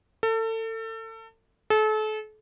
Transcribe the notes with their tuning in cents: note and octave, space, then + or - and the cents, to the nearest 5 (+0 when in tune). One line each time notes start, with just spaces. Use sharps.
A4 +30
A4 -35